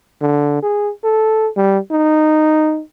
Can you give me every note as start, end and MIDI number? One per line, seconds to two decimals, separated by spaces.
0.21 0.61 50
0.63 0.91 68
1.04 1.48 69
1.56 1.78 55
1.91 2.81 63